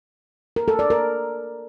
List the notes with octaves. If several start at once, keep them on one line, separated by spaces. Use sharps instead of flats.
A#4
A4
D5
A#4